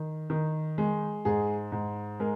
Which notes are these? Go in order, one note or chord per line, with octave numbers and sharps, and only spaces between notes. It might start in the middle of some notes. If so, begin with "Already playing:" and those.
Already playing: D#3
D#3
G#3
G#2 G#4
G#2
G#3 A#4